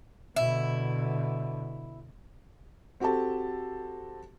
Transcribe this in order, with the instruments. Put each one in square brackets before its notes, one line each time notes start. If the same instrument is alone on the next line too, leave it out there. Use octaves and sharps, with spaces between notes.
[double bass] B2 D3 [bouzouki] E4
[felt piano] C4 F#4 G4 A4 A5